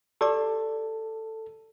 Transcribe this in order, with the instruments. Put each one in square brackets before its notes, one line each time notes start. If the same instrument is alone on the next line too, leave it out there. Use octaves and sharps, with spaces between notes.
[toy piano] G4 D5 D6 [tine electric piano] A4